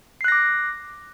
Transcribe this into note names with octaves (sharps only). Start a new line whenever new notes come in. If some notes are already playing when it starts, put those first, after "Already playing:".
D6 F#6 A#6 C7